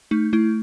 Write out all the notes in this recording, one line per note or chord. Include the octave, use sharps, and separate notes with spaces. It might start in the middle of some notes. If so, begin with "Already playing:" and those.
A3 D#4
A3 E4